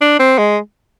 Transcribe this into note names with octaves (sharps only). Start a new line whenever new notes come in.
D4
C4
G#3